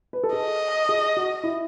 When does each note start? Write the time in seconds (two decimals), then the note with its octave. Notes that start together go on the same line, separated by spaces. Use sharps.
0.13 B4
0.24 A4
0.33 G#4 D#5
0.89 G#4
1.17 F#4
1.43 E4